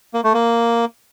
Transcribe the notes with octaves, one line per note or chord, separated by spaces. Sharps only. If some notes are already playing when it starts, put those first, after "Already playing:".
A#3
A3
A#3